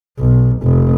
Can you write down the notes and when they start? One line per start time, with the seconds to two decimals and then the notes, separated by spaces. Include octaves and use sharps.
0.19 B1
0.62 F1